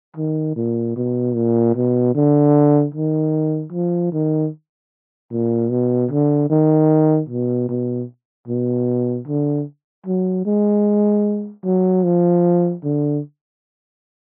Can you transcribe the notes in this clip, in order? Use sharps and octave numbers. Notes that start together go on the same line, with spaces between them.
D#3
A#2
B2
A#2
B2
D3
D#3
F3
D#3
A#2
B2
D3
D#3
B2
B2
B2
D3
F#3
G#3
F#3
F3
D3